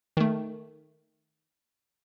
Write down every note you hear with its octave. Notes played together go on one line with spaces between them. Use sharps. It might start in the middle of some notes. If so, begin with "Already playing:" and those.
D#3 A3